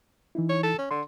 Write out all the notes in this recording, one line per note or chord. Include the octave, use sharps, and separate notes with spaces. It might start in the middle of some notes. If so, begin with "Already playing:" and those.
E3 D#4 E4
C#5
A4
C#4
D3 C6